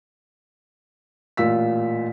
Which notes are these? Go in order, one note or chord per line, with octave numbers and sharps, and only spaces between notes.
A1 A#2 F4 E6 B6